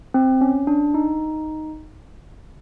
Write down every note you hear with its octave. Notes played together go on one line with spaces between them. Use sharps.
C4
C#4
D4
D#4